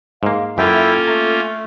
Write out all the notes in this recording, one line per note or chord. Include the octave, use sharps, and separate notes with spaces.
G#2 A#3 F5
F#2 A#3 C#4 E4 F4 A4 E5 G5
A3 A#5